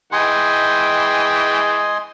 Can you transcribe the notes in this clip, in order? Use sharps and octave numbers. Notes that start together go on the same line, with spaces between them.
E3 G#3 D#5 G5 G#5 C6